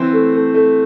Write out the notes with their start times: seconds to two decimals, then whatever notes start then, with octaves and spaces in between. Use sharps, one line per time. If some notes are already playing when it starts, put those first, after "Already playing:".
Already playing: E3 C4 C5
0.13 A3
0.34 A3
0.54 A3